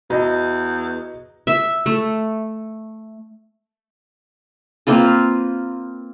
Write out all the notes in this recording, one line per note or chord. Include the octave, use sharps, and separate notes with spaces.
E2 F#4 D#5 A#5
E5
A3
A#3 C4 F4 B4